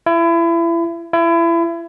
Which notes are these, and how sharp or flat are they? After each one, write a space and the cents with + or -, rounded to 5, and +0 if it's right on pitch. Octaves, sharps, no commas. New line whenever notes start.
E4 +30
E4 +30